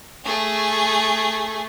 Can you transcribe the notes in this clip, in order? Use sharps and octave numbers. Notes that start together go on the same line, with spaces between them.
A3 G#4